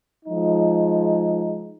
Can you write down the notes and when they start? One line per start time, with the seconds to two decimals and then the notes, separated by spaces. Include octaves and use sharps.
0.24 F3 G#3 D#4